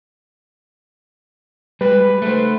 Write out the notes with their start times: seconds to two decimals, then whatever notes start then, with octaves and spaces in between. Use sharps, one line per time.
1.81 G3 G#3 B4
2.22 A3 C5